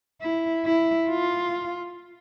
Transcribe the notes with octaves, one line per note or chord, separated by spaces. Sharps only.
E4
E4
F4